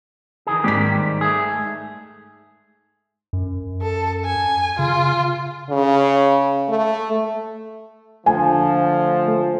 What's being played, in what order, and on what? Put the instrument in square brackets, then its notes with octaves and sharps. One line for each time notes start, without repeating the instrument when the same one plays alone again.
[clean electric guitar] D#3 E3 G#4
[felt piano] G#2 B6 [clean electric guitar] D#3 G3 G4
[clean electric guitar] A3 G#4
[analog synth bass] F#2
[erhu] A4
G#5
[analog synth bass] C#3 [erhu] F4
[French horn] C#3
A3
[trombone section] D3 F3 [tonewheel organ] A3 [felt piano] G#5